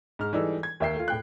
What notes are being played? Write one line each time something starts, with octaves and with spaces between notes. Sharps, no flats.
G#2 F6
E3 G3 G#3 D#4 A4 E6
G#6
D#2 A#3 E5 G5 C7
A3 F4
A2 G5 F#6